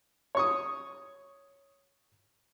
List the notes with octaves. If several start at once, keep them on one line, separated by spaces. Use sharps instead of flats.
C#5 C#6 D#6